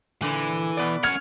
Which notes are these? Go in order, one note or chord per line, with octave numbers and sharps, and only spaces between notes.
A#2 D3 E3
B2 B3 D5
C#4 F#5 F6 G#6 F7